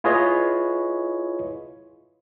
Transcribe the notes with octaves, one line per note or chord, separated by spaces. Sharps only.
E4 F4 G#4 B4 C#5 D#5